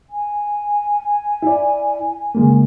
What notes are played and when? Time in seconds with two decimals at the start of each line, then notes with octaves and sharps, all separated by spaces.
0.10 G#5
1.43 E4 D5
2.35 C#3 G#3 A#3